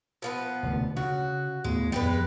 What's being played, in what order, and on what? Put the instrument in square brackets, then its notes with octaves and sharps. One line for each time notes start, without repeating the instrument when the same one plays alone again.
[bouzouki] F3 A#3 B3
[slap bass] E1 D2 C3
[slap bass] C#3 [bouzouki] F#4
[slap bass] D#2 A2 B3 [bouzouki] G#3
[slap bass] F2 B3 [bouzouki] G3 G#3 B4